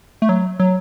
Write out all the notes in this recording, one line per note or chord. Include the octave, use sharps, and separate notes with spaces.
A3
F#3
F#3